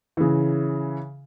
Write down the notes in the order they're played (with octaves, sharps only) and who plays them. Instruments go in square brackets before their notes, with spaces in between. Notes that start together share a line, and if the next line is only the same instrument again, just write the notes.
[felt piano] C#3 E3